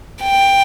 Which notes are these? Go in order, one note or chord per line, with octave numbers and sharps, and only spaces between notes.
G5